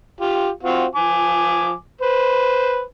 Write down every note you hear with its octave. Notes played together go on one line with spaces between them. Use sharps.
F4 G4
C4 F4 F#4
F3 G#5 D6
B4 C5